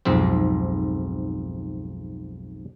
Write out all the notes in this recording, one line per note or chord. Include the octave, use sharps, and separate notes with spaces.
B1 F2 G#2 C4